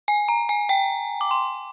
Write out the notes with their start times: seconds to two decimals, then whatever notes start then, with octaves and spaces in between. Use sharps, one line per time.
0.08 G#5
0.28 A#5
0.49 G#5
0.69 G5
1.21 D6
1.31 C6